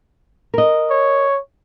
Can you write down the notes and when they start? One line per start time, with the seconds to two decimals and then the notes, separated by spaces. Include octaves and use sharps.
0.54 A#4 D#5
0.90 C#5